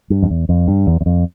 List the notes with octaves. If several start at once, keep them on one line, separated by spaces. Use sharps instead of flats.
G2
F2
E2
F2
G2
E2
E2
F2